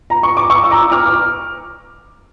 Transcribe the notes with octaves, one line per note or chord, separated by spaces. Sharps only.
A#5
C#6
D6
C#6 E6
E6
A#5 D6
D6 F6
D6 F6